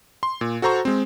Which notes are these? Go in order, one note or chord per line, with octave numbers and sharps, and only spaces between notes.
C6
A#2
F#4 A4 C5 A#5 C#6
G#3 C4